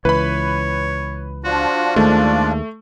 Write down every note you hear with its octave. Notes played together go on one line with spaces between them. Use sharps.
C#2 E3 B4 C#5 B5
F3 D4 F4 F#4
D#2 D#3 G#3 A3 D5